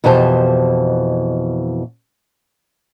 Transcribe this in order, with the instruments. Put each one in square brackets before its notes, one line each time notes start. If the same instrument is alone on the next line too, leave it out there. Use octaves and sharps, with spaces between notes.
[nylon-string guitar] F2 B2 E3 G4 C5 A5